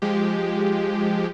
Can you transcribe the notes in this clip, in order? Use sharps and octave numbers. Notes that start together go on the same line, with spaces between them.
F3 G#3 G4